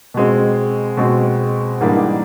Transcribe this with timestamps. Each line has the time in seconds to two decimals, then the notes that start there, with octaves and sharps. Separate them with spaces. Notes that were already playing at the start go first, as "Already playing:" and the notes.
0.14 B2 G#3 C4
0.97 B2 G#3 C4
1.81 G#2 E3 G3 A#3 D4